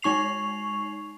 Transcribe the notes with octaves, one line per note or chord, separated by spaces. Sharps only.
G#3 D#4 C#6 C7 F7